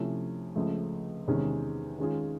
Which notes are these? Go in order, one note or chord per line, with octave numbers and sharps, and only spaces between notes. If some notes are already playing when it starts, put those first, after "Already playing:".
Already playing: C3 F3 A3 C#4 E4
C#2 C#3 F3 A3
E2 C3 D#3 G#3 C#4
D#3 G#3 C#4 F4 G#4